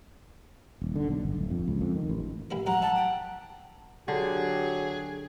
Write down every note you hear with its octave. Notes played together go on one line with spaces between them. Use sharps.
D#1
D3
B1
G1
D1
F2
C#2
F2
D#3
A1
A1 E4 A#4
G#2 F#3 F4 F#5 A#5
D#4 A5
G5
D3 F#3 G4 G#4